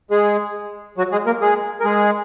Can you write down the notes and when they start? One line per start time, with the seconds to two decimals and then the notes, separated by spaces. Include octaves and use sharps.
0.11 G#3 G#4
0.98 F#3 F#4
1.12 G#3 G#4
1.26 A#3 A#4
1.41 G#3 G#4
1.80 A#4
1.84 G#3 G#4